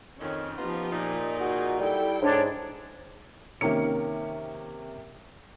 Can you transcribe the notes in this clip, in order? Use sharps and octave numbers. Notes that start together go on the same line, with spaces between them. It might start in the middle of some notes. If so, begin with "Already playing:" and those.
F2 D#3 C#4
F3 B3 D#4 F4 G4
A#2 D#4
F#4 G#4
G3 E4 A4 G5
G#2 D4 C#5
C3 D#3 A#3 C#4 C#7